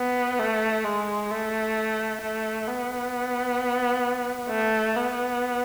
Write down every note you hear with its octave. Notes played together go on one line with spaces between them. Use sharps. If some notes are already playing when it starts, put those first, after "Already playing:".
Already playing: B3
A3
G#3
A3
A3
B3
A3
B3